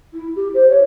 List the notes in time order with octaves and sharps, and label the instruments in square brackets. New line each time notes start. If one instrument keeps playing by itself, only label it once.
[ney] E4
G4
C5
C#5